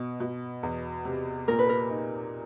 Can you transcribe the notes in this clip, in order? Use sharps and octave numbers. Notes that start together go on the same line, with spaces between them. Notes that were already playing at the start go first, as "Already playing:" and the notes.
Already playing: B2
B2
E2
C3
A#2 A#4
B4
A#4
D#4